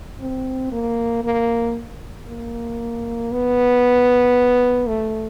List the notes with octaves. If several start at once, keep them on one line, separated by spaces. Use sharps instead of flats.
C4
A#3
A#3
A#3
B3
A3